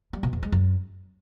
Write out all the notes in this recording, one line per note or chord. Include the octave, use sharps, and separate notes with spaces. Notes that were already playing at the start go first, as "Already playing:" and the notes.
G3
B2
E2
G#3
F#2